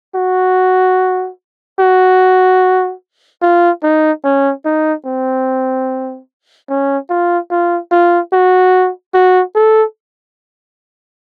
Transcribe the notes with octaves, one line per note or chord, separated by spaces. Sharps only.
F#4
F#4
F4
D#4
C#4
D#4
C4
C#4
F4
F4
F4
F#4
F#4
A4